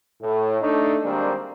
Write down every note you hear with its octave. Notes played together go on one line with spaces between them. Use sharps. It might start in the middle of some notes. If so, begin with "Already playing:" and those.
A2
A3 D4 D#4
D#3 G3 G#3 A#3 C4 D4